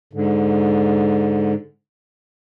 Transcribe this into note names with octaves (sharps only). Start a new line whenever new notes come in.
G#2 D3